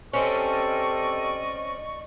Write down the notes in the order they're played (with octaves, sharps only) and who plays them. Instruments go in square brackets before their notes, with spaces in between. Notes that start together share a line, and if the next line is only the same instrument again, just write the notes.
[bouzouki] C4 C#4 [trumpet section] G4 A4 [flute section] D5 D#5 C#6